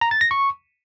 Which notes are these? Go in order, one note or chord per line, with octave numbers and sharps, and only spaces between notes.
A#5
A6
A#6
C#6